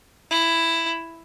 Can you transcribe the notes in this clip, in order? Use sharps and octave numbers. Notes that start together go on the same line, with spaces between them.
E4